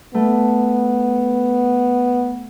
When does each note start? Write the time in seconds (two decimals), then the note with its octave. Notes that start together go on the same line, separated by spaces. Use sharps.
0.15 A3 B3